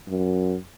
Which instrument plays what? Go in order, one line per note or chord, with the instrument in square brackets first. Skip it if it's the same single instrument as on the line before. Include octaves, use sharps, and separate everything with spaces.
[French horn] F#2